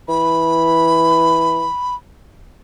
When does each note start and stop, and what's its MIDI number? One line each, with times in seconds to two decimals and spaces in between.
0.09 1.67 52
0.09 1.95 83